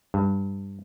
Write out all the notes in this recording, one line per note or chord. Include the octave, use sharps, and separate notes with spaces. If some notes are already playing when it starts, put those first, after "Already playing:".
G2